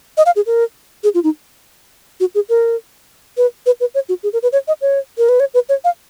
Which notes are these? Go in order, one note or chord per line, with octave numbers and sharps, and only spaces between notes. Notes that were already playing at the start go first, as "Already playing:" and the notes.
D#5
F5
G#4
A#4
G#4
F4
D#4
F#4
G#4
A#4
B4
B4
B4
C#5
F#4
G#4
A#4
B4
C#5
D#5
C#5
A#4
B4
C#5
B4
C#5
F5